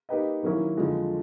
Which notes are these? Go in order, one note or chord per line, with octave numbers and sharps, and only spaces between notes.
A#3 D#4 G4 B4 D#5
D#3 F#3 A#3 C#4 E4
F2 D3 F3 G#3